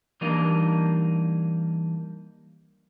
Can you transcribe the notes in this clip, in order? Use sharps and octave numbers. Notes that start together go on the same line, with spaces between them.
E3 G3 A#3 D4 D#4